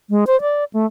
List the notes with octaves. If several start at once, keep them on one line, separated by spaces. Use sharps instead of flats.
G#3
C5
D5
A3